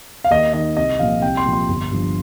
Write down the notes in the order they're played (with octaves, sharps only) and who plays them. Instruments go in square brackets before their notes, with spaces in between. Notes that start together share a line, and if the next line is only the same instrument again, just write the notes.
[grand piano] F5
D#2 D#5
D#3 D#5
C2 D#5
A#2 F3 F5
C2 G5
C6
A#2 F3
C6
G1
G2 F3